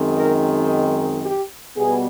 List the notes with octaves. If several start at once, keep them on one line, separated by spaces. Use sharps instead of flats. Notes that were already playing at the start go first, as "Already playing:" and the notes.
Already playing: F#2 D#3 G#3 C4 D#4
A#4
G4
B2 G3 B3 G#4